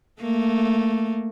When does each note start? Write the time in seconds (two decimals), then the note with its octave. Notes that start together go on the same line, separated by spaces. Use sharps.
0.21 A3 A#3